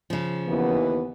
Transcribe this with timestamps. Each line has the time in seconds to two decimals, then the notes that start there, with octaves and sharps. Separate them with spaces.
0.10 C#3 F3
0.48 D#2 E3 B3